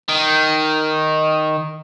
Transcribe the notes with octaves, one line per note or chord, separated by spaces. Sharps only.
D#3